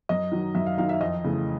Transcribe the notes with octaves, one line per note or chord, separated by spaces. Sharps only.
F#2 D#5
D#3 F#3
F#2 E5
F5
D#3 F#3 F5
E5
F2 D#5
C#3 E3 A3